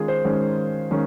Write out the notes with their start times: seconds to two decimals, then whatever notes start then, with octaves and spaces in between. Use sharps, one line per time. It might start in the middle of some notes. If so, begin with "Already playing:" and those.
Already playing: D#3 G#3 C#4 F4 G#4
0.08 C5
0.25 D#3 G#3 C#4
0.91 D#3 G#3 C#4